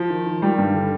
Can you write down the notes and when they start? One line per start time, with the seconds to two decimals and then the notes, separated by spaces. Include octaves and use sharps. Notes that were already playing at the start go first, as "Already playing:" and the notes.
Already playing: F3
0.10 D#3
0.26 D#3
0.42 D#3 G3
0.58 G2
0.74 D3